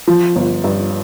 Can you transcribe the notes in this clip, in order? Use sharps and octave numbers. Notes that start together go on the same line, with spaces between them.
F3
G1
G2